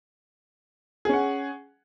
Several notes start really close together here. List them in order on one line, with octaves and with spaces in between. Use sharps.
G#4 C#4 F#5